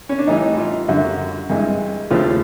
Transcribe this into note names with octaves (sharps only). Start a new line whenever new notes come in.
C#4
D4
A2 E3 G3 D#4
F4
F#2 D3 G3 F#4
G2 E3 G#3
D#2 C#3 F3 A3 F4